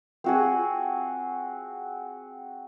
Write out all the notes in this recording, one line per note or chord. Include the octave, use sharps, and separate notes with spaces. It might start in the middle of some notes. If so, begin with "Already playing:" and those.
C4 F#4 G#4